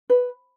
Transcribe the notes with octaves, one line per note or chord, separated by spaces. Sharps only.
B4